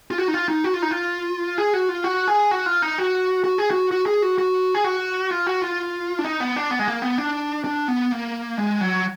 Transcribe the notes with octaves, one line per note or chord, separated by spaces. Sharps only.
F4
F#4
D#4
F4
D#4
F#4
F4
D#4
F4
G#4
F#4
F4
F#4
G#4
F#4
F4
D#4
F#4
F#4
G#4
F#4
F#4
G#4
F#4
F#4
G#4
F#4
F4
F#4
F4
D4
D#4
B3
D4
B3
G#3
A#3
B3
D4
D4
B3
A#3
G#3
F#3